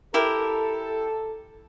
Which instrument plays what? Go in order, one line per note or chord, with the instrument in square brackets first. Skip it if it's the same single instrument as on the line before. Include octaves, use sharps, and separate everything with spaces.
[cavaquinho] E4 G4 A#4 [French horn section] A4